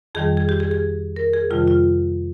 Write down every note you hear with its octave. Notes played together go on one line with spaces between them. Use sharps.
F2 D#3 G3 G#4
G#4
G4
G#4
G#4
A#4
G#4
F2 C3 D#3 G3 F4
F4